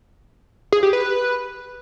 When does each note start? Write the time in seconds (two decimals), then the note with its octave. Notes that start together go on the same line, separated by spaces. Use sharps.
0.72 G#4
0.83 G4
0.93 B4